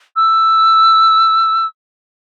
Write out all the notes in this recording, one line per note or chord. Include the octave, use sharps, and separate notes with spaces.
E6